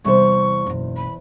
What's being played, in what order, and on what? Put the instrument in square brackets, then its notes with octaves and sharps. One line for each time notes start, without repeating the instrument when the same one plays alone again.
[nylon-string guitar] E2 C5 [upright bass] C3 G3 [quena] C#6
[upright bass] F#1 B1
[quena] B5